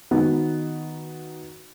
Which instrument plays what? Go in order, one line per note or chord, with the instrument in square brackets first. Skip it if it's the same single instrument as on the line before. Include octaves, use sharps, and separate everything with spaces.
[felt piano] D#3 B3 D#4 F#4